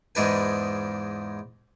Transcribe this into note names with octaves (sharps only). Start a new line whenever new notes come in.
E2 G#2 G#3 D4 B4 G#5